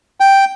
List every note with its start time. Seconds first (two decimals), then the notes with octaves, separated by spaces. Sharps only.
0.20 G5